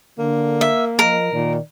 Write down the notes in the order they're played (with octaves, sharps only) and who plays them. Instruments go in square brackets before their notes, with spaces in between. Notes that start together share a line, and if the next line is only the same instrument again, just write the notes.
[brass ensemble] D3 [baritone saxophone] A#3
[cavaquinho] E5
[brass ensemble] F3 D#5 [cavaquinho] A#4
[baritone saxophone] A#2 [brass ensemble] D#3 D5